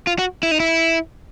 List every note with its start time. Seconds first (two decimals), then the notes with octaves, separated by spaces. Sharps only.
0.07 F4
0.19 F#4
0.43 E4
0.51 D#4
0.60 E4